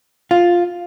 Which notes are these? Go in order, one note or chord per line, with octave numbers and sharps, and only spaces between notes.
F4